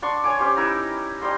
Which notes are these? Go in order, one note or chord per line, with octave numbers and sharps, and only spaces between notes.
D4 C6 C#6
C#5 G#5 D6
C#4 G4 C5 C6
D#4 E4 B4 A#5
G3 D#4 D#5 C6